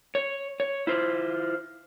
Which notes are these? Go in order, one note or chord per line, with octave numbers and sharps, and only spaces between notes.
C#5
C#5
E4 F4 C5